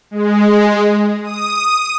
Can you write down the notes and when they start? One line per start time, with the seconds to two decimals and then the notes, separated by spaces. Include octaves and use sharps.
0.11 G#3
1.23 D#6